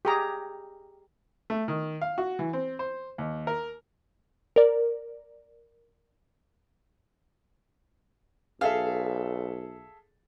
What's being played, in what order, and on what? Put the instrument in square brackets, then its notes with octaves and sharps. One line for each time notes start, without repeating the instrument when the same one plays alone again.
[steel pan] G4 G#4 A#5
[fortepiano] A3
D#3
F5
F#4
E3
C4
C5
D#2
A#4
[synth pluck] A#4 D5
[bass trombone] B1 [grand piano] G#4 A4 E5 [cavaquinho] F5